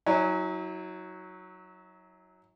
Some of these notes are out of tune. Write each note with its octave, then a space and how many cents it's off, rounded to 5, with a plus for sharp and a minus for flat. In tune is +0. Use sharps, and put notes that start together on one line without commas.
F#3 +0 E4 -45 G#5 -5